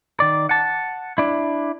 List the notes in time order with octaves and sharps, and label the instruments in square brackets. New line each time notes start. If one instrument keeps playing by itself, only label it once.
[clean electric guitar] D#3 D5
F#5 A5
D4 E4